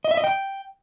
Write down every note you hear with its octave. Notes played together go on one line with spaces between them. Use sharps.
D#5
E5
D#5
G5